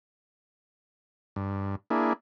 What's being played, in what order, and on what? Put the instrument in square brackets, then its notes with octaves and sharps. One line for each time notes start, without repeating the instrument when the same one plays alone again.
[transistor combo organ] G2
A#3 D4 E4 G#4